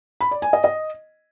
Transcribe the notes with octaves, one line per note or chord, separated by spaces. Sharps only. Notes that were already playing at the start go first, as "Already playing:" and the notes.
B5
D5
G#5
D#5
D#5